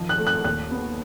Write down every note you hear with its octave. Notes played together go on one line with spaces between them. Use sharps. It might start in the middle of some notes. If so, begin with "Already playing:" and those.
Already playing: D#3 F3
F#6
A3
F#6
D#2 F#6
B3